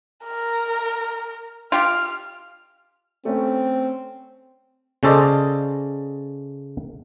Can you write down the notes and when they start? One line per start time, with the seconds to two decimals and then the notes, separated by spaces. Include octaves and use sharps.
0.24 A#4
1.72 F4 G4 F6
3.25 A3 C4 C#4
5.03 C#3 C#4 A4 C5 D5 D#5